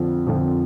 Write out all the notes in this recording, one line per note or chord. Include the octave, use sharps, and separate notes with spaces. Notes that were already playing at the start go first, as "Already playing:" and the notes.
Already playing: F2 D3 F3
F2 D3 F3